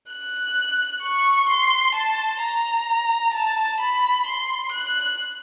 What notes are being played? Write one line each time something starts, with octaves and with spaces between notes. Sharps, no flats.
F#6
C#6
C6
A5
A#5
A5
B5
C6
F#6